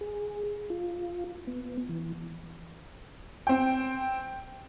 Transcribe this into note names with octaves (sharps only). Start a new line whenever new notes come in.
G#4
F4
B3
E3
C4 G5